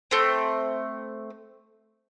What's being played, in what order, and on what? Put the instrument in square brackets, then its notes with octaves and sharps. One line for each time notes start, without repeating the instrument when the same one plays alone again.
[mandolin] A3 C4